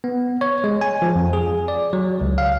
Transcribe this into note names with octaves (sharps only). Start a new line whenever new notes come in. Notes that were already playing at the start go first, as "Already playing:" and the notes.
B3
C#5
G#3
G#5
F3
F2
G#4
D5
F#3
C#2
F5